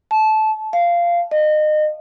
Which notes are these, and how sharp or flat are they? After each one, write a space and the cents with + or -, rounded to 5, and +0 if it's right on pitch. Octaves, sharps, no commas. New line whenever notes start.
A5 -20
F5 -15
D#5 -30